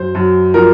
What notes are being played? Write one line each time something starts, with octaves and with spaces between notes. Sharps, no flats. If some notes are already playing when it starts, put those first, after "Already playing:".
Already playing: F#2 C5
F#2
F3 A#4